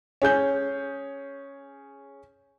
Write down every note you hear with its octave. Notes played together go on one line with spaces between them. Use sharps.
C#4 G#4 G6